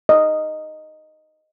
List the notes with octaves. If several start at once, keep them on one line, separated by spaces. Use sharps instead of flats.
D#5